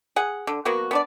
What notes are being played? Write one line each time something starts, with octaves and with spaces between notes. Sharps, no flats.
G#4 F#5
D3
F#3 A#3 B3 F#4
B3 D4 D5